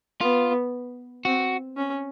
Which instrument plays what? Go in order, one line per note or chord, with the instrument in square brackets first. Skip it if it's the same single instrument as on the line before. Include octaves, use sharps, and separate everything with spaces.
[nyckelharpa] B3 [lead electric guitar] F4
[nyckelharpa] C4 [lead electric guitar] F#4
[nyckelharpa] C#4